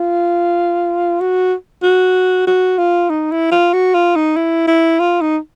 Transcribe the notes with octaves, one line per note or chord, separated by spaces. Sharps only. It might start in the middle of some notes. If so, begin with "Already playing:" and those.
Already playing: F4
F#4
F#4
F#4
F4
D#4
E4
F4
F#4
F4
D#4
E4
E4
F4
D#4